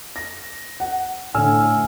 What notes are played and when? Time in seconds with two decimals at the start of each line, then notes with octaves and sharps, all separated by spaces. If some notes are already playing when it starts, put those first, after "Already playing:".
0.16 A#6
0.80 F#5
1.35 A2 D3 G#5 E6 F6